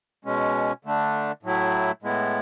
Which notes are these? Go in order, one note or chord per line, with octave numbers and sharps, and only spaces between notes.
B2 G#3 C#4
D3 A3 D4
A2 F#3 A3 E4
A2 G#3 B3 E4